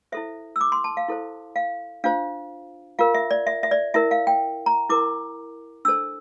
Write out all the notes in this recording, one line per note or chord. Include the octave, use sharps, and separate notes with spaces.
E4 A4 C5 E5
E6
D6
C6
A5
F5
E4 A4 C5
F5
D4 F4 C5 F5
F4 A#4 F5
E5
D5
E5
E5
D5
E4 A#4 E5
F5
G5
A#5
E4 A#4 D6
D4 A4 C5 E6